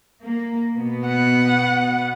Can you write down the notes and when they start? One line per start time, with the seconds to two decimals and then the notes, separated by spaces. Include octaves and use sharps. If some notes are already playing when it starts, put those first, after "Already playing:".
0.24 A#3
0.76 B2 B3
1.07 F#5